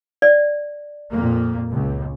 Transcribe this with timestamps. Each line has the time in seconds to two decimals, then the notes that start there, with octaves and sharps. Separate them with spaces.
0.22 D5
1.11 F2 A#2 A#3
1.70 C#2